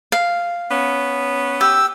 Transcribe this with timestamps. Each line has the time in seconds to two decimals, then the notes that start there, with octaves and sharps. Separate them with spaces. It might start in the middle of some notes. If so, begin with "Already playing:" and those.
0.12 F5
0.71 B3 C#4
1.61 G4 E6